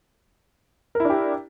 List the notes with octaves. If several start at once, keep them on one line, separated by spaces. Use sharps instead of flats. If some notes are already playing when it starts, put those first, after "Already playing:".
D4 E4 G4 A#4